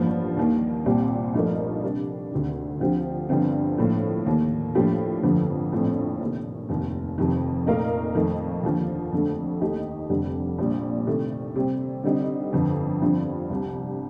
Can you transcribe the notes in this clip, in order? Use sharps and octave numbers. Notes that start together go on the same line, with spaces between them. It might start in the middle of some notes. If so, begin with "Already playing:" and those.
Already playing: A1 G2 F3 A#3
D#2 D#3 A#3
C2 A#2 G3 C4
G2 F3 A3 D#4 A#4
C3 G3 D4
D2 C3 D#3
D2 D3 F3 C4 G4
G1 G2 D3 F3 C4
A2 F3 A#3
D#2 D#3 A#3
A2 F3 A#3 D4 G4
G1 F2 D3 F3
A#1 A2 F3 A3 C4
C3 D#3 A#3
F1 D#2 D#3
F1 F2 C3 D#3
A#2 A3 D#4 A#4 F5
F2 D#3 A3 D#4
D#2 D3 F3 A#3
F2 D3 A3
D#2 D#3 A3 D#4 G4
F1 F2 D3 G3
A#1 A#2 G3
C3 D#3 A3
C3 G3 C4
D3 G3 C4 D#4
G1 F2 D3
G1 G2 D3 F3 C4
C2 C3 G3